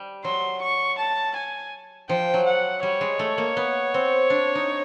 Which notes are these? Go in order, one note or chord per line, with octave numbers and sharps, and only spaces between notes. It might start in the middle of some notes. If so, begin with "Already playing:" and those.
Already playing: G3
F#3 C6
C#6
A5
G#5
F3 G5
F#3
F#5
G3 C#5
G#3
A3
A#3
B3
C4
D4
D#4